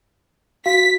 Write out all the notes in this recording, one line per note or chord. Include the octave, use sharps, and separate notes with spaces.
F#4 F5 B6